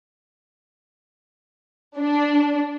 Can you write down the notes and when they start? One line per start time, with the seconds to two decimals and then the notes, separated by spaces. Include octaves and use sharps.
1.99 D4